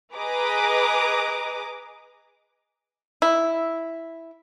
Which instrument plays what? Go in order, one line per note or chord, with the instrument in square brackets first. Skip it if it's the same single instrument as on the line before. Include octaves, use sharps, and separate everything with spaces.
[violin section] G#4 B4 D#5 A#5 D6 D#6
[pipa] E4